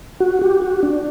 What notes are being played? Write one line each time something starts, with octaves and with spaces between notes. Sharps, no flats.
F#4
G4
F#4
D4